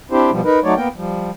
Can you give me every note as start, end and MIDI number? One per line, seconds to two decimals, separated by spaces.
0.11 0.30 60
0.11 0.30 62
0.11 0.30 64
0.11 0.30 67
0.11 0.30 72
0.31 0.41 47
0.31 0.41 53
0.31 0.41 55
0.44 0.59 63
0.44 0.59 70
0.44 0.59 71
0.64 0.75 54
0.64 0.75 57
0.64 0.75 63
0.64 0.75 73
0.64 0.75 74
0.76 0.88 58
0.76 0.88 59
0.76 0.88 70
0.76 0.88 79
0.96 1.31 53
0.96 1.31 55